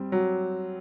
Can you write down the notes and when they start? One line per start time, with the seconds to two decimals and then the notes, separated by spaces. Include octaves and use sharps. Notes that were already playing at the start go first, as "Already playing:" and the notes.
Already playing: G3 C4
0.12 F#3